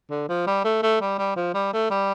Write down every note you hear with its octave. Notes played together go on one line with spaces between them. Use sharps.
D3
F3
G3
A3
A3
G3
G3
F3
G3
A3
G3